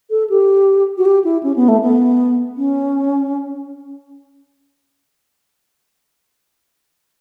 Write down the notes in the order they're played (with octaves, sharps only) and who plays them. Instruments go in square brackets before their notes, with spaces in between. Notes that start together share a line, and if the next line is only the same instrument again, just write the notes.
[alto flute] A4
G4
F#4
G4
E4
C#4
B3
A3
B3
C#4